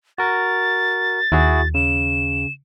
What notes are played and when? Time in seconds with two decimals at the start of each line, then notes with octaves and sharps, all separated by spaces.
0.18 F#4 A#4 A6
1.32 D#2 E4 F#4 G#4
1.74 C#3 E7